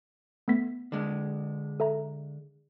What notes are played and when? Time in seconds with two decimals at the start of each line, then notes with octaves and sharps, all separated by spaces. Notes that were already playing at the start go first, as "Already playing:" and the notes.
0.48 A3 B3 B6
0.92 D3 G#3
1.80 A4 E5 A#5